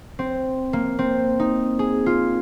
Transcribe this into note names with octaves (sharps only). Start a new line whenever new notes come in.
C4
A#3
C4
D#4
G#4
F4